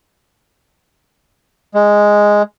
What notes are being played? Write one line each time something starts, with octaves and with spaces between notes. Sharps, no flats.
G#3